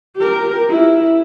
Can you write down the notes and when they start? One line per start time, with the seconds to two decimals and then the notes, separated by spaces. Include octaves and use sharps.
0.16 G4 A#4
0.69 E4